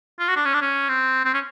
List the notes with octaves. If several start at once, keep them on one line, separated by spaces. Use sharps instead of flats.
F4
F#4
D4
C#4
D4
C#4
C4
C4
C#4